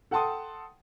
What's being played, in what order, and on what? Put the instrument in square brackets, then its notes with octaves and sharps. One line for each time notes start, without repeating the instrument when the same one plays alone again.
[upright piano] A4 F#5 G5 A5 C6 D#6